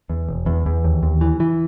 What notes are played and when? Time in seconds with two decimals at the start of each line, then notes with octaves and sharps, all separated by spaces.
0.10 E2
0.28 E1
0.46 E2
0.66 E2
0.84 D#2
1.03 D#2
1.21 E3
1.40 E3